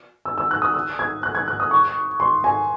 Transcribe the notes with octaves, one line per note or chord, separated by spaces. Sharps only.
E6
E6
F#6
D#6
E6
G#6
F#6
G#6
F#6
D#6
C#6
C6
G#5